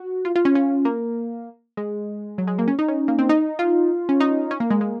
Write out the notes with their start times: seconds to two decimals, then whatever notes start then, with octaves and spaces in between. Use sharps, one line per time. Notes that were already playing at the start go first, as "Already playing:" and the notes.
Already playing: F#4
0.25 F4
0.36 F4
0.45 C#4
0.55 C#4
0.85 A#3
1.77 G#3
2.38 F#3
2.47 G#3
2.59 A#3
2.68 C#4
2.79 D#4
2.88 C#4
3.08 A#3
3.19 C4
3.29 D#4
3.59 F4
4.09 C#4
4.20 D#4
4.51 C#4
4.60 A#3
4.70 G#3
4.81 G#3